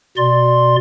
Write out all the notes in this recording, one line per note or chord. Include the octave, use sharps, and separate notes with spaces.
B2 D5 C6